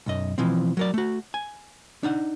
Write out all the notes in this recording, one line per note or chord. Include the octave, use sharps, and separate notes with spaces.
B1 F#2 D#5
B2 E3 F3 C4
F#3 A#4 D5
A3 F#4
G#5
D4 D#4 F#5